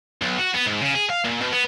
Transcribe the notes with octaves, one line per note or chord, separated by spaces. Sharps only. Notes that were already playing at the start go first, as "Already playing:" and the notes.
B1
F#4
B3
G#2
C#3
G#4
F5
A#2
B2
B3